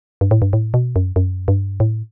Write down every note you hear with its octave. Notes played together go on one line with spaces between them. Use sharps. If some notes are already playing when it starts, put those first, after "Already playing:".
G2
A2
G2
A2
B2
F#2
F#2
G2
A2